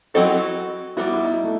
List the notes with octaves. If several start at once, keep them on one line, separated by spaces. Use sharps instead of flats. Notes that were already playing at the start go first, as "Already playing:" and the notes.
F#3 C4 E4 F#4 A4 D#5
G3 B3 E4 F#4
E4
D#4
A3